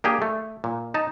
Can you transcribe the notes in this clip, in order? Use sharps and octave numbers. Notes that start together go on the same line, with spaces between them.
A#3 D4 G4 G#4
A3
A#2
D#4 A5